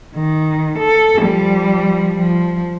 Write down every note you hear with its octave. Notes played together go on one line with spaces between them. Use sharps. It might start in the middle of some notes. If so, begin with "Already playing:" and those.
D#3
A4
F3 G3
F3